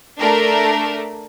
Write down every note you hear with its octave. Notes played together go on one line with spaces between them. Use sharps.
A3 D4 A#4